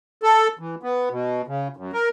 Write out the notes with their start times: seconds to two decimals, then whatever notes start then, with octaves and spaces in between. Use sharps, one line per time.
0.23 A4
0.59 E3
0.83 B3
1.11 B2
1.47 C#3
1.77 F#2
1.93 A#4